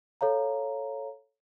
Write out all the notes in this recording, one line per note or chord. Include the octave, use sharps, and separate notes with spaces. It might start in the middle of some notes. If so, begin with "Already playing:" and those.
A4 C#5 F5 A#5